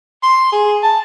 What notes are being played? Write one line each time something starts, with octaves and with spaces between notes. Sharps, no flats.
C6
G#4
A5